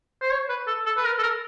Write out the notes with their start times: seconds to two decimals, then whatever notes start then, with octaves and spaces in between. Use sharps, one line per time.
0.22 C5
0.31 C#5
0.49 B4
0.67 A4
0.86 A4
0.97 B4
1.05 A#4
1.19 A4
1.23 A#4